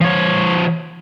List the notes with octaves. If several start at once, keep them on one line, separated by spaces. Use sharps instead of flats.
F3 C#5